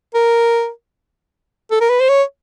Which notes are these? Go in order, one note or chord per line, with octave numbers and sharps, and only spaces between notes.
A#4
A4
A#4
B4
C5
C#5